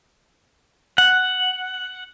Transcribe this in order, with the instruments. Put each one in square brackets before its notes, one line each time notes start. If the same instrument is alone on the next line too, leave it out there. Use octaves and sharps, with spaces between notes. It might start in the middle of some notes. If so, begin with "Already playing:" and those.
[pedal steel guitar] F#5